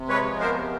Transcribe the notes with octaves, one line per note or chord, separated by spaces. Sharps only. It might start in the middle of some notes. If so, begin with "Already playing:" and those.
Already playing: C3
G#3 B4 C#5
F3
B3 A#4 C5
C3